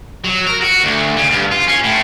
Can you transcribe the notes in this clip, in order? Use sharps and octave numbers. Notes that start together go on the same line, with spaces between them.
F#3
A#4
F#4
D2
C#3
G2
F4
C#4
A2